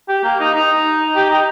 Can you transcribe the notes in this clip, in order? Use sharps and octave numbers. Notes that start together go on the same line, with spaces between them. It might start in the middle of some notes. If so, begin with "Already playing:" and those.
G4
A#3
D#4
D#4
G4
D#4